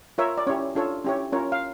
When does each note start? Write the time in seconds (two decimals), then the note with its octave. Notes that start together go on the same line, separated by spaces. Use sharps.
0.18 F4 A#4 C#5 E5
0.38 D5
0.47 C#4 E4 G4 C#5
0.75 D4 F4 A4 C#5
1.04 C#4 E4 G4 C#5
1.32 C#4 F4 A#4 C#5
1.52 F5